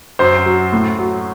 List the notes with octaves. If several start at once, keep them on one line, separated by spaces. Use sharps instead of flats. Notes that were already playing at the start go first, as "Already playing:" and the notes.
F#2 C5
F#3
A2
F#3